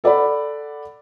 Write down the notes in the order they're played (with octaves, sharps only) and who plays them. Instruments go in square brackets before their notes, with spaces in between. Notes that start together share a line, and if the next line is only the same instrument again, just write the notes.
[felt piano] A4 D5 F#5 B5